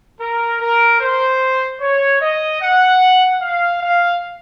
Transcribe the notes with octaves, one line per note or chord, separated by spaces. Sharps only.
A#4
A#4
C5
C#5
D#5
F#5
F5
F5